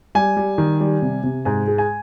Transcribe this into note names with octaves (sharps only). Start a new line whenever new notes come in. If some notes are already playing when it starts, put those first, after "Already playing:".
G3 G#5
G3
D#3
G3
C3
C3
G#2 G#5
G#3
G#5